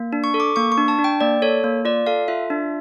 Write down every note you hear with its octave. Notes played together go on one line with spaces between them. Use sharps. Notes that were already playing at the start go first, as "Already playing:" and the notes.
Already playing: A#3
D4
C#6
A4
D6
A#3 C#6
C#6
D4
A5
D4
G5
A#3 D5
A4 C#5
A#3
F4 D5
A4 F5
F4 E5
D4